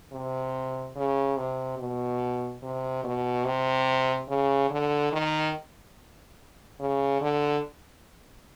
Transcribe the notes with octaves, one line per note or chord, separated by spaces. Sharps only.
C3
C#3
C3
B2
C3
B2
C3
C#3
D3
D#3
C#3
D3